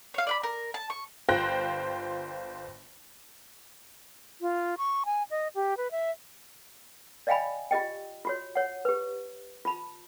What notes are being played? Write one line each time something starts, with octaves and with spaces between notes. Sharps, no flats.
C#5 F5
D5 F5 B5
A#4
A5
C#6
G1 F4 C5 G5 F#6 A#6
F4
C#6
G#5
D#5
G4
B4
E5
D5 D#5 F5 G5 G#5 B5
F4 G4 D#5 G5
F4 F#4 C#5
C#5 F#5
G4 B4
F4 A5 B5